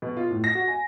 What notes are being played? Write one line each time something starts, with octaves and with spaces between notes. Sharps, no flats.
B2
F4
A2
A#6
F#4
G#5